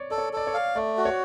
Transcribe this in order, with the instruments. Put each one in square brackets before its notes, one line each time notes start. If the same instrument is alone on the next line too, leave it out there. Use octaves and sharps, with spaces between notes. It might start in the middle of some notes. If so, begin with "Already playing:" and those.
Already playing: [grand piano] C#5 D5
[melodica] A4 [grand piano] D5
[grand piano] C#5
[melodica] A4 [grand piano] D5
[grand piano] C#5
[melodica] F5
[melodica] A3 [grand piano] D5
[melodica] F#4
[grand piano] C#5